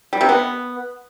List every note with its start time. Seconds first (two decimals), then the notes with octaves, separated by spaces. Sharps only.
0.13 G3
0.21 C3
0.29 B3